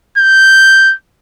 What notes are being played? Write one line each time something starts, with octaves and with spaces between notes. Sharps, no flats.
G6